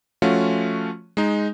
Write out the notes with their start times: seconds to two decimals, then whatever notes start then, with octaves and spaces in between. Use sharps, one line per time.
0.22 F3 A3 C#4 F4 F#4
1.17 G#3 D#4